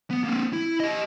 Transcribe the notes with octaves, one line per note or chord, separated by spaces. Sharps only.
B3
A#3 C4
E4
G4 D#5